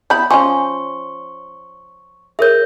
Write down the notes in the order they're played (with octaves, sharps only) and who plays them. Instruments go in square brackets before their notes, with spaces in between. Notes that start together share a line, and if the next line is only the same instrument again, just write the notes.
[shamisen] B3 E4 B5 [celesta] G6
[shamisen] F3 C#4 [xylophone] G#5 [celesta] C6 [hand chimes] C#6
[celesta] G#4 A#4 C#5 [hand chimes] E5 G6